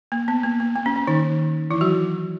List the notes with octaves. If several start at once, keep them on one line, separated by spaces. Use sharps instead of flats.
A#3
B3
A#3
A#3
A#3
C#4
C#4
D#3 D#4
E3 E4
F#3 F#4